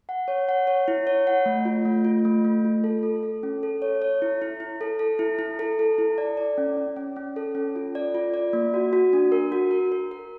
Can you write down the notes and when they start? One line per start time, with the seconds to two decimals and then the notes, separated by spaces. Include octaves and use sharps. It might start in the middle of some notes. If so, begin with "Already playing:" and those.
0.09 F#5
0.28 C#5
0.49 F#5
0.67 C#5
0.88 E4
1.07 C#5
1.27 F#5
1.46 A3
1.65 F4
1.85 A3
2.05 F4
2.25 A3
2.45 A3
2.65 F4
2.84 A4
3.03 A4
3.23 A4
3.43 C#4
3.63 A4
3.82 C#5
4.02 C#5
4.22 E4
4.42 E4
4.60 E4
4.81 A4
4.99 A4
5.19 E4
5.39 E4
5.59 A4
5.79 A4
5.98 E4
6.18 D5
6.37 D5
6.58 C#4
6.77 C#4
6.96 C#4
7.16 C#4
7.36 A4
7.55 C#4
7.76 F4
7.95 D5
8.15 F4
8.34 D5
8.53 A#3
8.74 F#4
8.93 F#4
9.13 D4
9.32 A#4
9.52 F#4
9.71 A#4
9.92 A#4
10.11 A#4